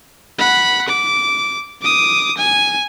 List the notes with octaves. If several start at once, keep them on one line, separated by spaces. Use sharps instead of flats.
F#5 B5
D6
D6 D#6
G#5